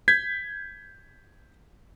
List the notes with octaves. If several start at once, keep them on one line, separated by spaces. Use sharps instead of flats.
G6 G#6 B6